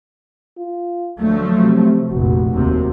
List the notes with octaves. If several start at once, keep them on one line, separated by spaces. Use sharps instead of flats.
F4
D2 F3 F#3 A3
C3
F1 A#1 F#4
D#2 C3